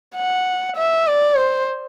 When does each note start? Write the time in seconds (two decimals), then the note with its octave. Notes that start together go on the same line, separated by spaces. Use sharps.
0.15 F#5
0.76 E5
1.07 D5
1.37 C5